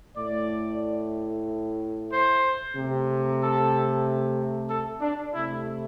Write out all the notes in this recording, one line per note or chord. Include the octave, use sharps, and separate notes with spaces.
A2 A3 D5
C5
C3 A3
A4
A4
D4
C3 A3 E4